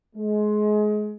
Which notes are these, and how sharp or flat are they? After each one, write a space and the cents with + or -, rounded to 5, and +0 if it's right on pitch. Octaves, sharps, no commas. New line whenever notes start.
G#3 +25